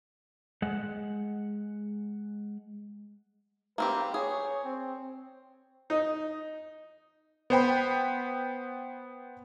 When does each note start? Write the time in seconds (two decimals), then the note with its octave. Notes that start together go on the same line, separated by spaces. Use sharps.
0.62 G#3 F#5
3.78 A#3 C4 G4 B4
4.14 G#4 C#5
4.64 C4
4.99 C4
5.90 D#4
7.50 B3 C5 G5 B5